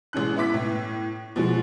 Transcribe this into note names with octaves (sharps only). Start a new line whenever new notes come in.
A1 G#3 C#4 F#6
B3 E4 E5 D6 B6
A2
B2 F3 G#3 F#4